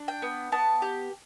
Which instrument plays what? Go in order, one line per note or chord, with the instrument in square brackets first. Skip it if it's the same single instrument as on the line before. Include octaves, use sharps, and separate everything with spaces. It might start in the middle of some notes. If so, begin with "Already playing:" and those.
Already playing: [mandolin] D4
G5
B3
B3 A5
G4